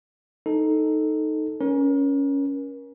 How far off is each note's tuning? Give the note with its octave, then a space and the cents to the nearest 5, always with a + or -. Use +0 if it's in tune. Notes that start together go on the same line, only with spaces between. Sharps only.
D#4 +0 A4 +0
C#4 +5 A#4 +35